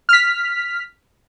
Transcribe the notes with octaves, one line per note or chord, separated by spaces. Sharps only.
F6 B6